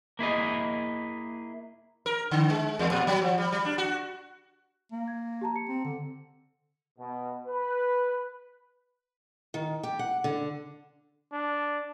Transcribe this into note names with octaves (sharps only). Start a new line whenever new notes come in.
A#3 E4 G#4 D#5
A#4
D3
G#3
E2
A#2
F#3
F3
G3
G3
D4
F#4
A#3
G#6
G4 A5 A#5
C#7
C4
D3
B2
B4
D#3
G4
F#5
D3
D4